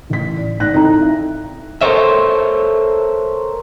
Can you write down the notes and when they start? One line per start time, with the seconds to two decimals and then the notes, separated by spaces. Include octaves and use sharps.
0.10 A1 B6
0.36 D5
0.60 G#2 D5 F#6 A#6
0.73 C4 D#4 E4 A4 G5 A#5
1.02 E5
1.81 A4 A#4 C5 C#5 E5